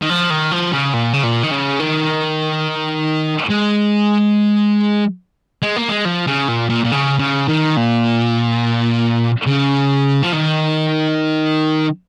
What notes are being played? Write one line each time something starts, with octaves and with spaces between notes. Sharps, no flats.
D#3
F3
D#3
F3
C#3
A#2
C#3
A#2
D#3
C#3
D#3
G#3
G#3
A#3
G#3
F3
C#3
A#2
A#2
A#2
C#3
C#3
D#3
A#2
C#3
F3
D#3